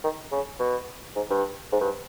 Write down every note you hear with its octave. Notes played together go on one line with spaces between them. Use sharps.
D#3
C#3
B2
G#2
G2
G#2
G2